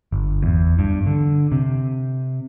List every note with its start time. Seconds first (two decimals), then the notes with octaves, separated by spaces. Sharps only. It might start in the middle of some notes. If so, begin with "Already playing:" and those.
0.12 G1
0.43 E2
0.79 G2
1.07 D3
1.52 C3